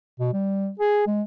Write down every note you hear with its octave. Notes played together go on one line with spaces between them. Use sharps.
B2
G3
G#4
G#3